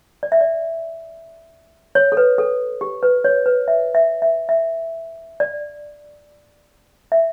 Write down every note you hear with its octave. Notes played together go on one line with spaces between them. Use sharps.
D5
E5
D5
C#5
A4
B4
A4
G4
B4
C#5
B4
E5
E5
E5
E5
D5
E5